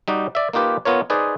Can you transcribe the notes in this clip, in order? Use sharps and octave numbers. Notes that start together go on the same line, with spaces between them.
G3 D#4 F#4 G4
D5 E5
A#3 D#4 F4 G4 B4
B3 F4 A#4 C#5
D#4 G#4 B4 C5 D5